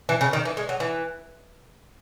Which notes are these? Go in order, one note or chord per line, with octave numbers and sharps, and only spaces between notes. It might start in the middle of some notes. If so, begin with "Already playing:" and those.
E3
C#3
D#3
E3
G#3
F#3
E3